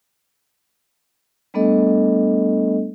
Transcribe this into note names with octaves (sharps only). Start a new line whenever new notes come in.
G3 A3 B3 D4 A4 D#5